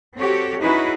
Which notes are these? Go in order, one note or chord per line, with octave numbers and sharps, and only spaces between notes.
C4 F#4 G4 A4 C#5
C#4 D#4 E4 F#4 G#4 B4